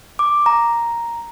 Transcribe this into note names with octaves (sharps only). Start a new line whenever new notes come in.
D6
A#5